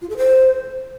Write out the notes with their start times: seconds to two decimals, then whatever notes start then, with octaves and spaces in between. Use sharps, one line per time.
0.01 F4
0.09 A4
0.17 C5